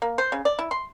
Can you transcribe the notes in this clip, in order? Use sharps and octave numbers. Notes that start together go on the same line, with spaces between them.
A#3
C5
C#3
D5
E4
C6